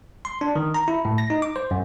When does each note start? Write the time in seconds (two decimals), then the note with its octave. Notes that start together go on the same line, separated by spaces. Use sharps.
0.25 C6
0.41 D4
0.56 D#3
0.74 A#5
0.88 E4
1.05 A2
1.18 A#6
1.30 D#4
1.42 D6
1.56 C5
1.71 F#2